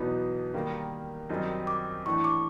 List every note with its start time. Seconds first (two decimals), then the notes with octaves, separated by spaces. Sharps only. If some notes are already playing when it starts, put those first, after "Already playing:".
Already playing: E2 B2 F#3 B3 D#4
0.54 D#3 G3 A#3
1.29 F#2 D#3 G3 C4 D#4
1.67 D6
2.05 A2 E3 A3 D4 C#6
2.24 D6